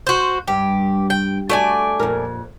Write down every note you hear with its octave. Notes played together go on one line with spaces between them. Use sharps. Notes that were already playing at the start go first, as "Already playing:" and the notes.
F#4 C5
G2 G4
G5
A3 F#4 D5 G#5
F2 A#2 A#4